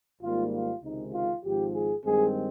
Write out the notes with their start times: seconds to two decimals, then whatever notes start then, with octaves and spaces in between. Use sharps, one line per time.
0.22 G#1 G#2 G3 A#3 F4
0.53 F4
0.83 C#2 C3 D#3 G#3 D#4
1.13 F4
1.43 G#1 G#2 F3 G4
1.74 G#4
2.04 G2 D#3 G#3 C4 G#4